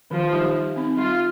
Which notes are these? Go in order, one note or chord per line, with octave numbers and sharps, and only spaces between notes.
D#3 F3
G3 D#4 G4
G3
C4 D#4
G3 F4